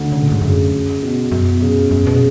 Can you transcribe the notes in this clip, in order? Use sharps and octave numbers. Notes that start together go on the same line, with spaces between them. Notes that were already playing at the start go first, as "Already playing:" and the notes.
Already playing: D2 D3
C#3
A2
G#2
F#2 C#3
B2
F#2
B2
C#3
F#2
B2
C#3